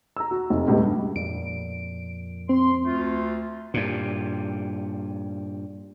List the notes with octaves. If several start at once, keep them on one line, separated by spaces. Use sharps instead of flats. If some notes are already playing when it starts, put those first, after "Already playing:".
A#5 E6
F#4
F1
C#2 A2 C#3 G3 B3
G2
F2 A#2 D7
C4 C6
D2 A3 F4
G2 A#2